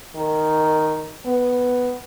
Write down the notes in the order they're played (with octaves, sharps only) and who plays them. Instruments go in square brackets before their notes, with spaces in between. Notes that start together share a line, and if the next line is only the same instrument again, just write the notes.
[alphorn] D#3
B3